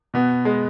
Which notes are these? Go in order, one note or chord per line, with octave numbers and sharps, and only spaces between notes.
B2 B3
G#3